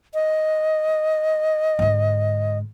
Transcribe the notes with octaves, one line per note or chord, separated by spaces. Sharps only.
D#5
G#2 D3